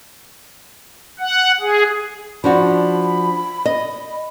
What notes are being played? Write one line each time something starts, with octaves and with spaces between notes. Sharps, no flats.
F#5
G#4
F3 D4 F#4 B5
D#5